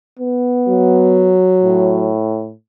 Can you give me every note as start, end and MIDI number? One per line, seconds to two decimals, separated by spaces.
0.19 1.37 59
0.68 2.13 54
1.63 2.52 45